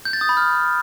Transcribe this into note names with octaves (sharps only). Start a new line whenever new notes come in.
G6
A6
D#6
B5
F6